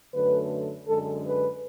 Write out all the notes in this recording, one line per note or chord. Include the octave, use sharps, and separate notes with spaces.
F#2 D3 F#3 A3 B4
F#2 D3 G#3 A4
B4